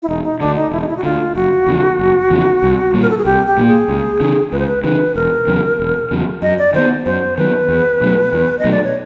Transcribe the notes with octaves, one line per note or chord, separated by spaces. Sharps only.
E4
E1 D#4
D#4
D2 D3 D4
D#4
E1 E4
D#4
E4
F#4
D2 D3 F4
F#1 F#4
E2 C#3 F3
F#1
E2 C#3 F3
C2
A#2 G3 A#3
A#4
A4
G#4
C2 G4
G4
A#2 G3 A#3
G#4
C#2
C#3 E3
C#2 B4
C5
B4
C#3 E3 B4
E1 A#4
E2 C#3 F#3
E1
E2 C#3 F#3
F#2 D#5
D5
D#3 F#3 B3 C5
F#2 C5
D#3 F#3 B3 B4
E2
B2 F#3 A3
E2
D#5
B2 F#3 A3
D5
C#5